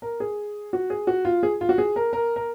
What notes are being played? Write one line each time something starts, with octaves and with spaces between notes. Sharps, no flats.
A#4
G#4
F#4
G#4
F#4
F4
G#4
F4
F#4
G#4
A#4
A#4
A#4